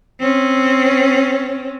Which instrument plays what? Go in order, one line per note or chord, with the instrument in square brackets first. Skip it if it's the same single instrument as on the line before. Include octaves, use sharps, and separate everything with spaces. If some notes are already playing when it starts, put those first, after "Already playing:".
[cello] C4 C#4